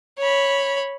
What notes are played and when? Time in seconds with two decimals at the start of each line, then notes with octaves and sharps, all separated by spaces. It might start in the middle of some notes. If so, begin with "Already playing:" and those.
0.19 C#5 B5